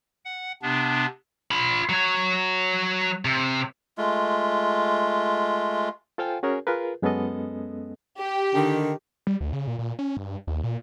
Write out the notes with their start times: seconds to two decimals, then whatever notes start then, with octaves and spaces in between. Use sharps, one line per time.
0.25 F#5
0.62 C3 B3 D4
1.51 F4 B5
1.89 F#3 C#5
3.25 C3
3.98 G#3 A3 F4
6.18 F4 A4 C5 F5 G5 G#5
6.43 C#4 F#4 G#4 A#4 C#5
6.67 F4 G#4 A#4 B4
7.02 F#2 G#3 B3 C#4 A4 D#5
8.18 G4
8.54 D3 D#3
9.27 G3
9.41 D2
9.53 C#3
9.67 A#2
9.79 A#2
9.99 C#4
10.17 G2
10.47 D#2
10.63 A#2